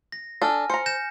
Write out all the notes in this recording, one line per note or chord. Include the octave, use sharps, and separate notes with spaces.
A#6
D4 A4 G#5 F6
C5 A#5 C#7
G6 A#6 E7